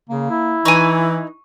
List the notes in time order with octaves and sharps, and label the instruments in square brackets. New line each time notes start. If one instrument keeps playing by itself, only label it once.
[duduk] C#3 [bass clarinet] A#3
[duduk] E4
[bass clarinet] E3 [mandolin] D#4 B4 G#5 [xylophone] C#6 D#7